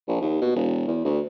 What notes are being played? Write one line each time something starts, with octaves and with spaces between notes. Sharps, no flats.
A#1
D#2
B2
E1
E2
D2